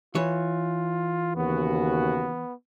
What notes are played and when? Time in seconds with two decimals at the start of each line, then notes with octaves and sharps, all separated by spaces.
0.15 E3 F4 C#5
1.36 D#2 C#3 B3 F#4